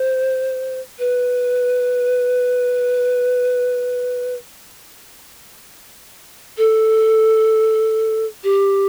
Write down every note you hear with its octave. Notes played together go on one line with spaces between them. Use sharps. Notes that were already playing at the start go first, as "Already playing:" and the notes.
Already playing: C5
B4
A4
G4